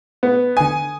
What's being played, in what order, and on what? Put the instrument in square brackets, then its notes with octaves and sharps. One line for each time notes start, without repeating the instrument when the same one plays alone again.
[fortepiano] B3
[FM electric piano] D3 D#6 [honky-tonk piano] G#5